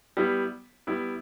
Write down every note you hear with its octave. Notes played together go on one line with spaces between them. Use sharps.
G3 B3 E4
G3 B3 E4